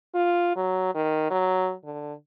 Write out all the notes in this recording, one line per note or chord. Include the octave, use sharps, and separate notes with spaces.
F4
F#3
D#3
F#3
D3